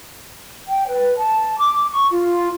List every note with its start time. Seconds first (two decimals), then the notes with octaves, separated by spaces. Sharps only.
0.67 G5
0.87 B4
1.17 A5
1.58 D6
1.90 C#6
2.11 F4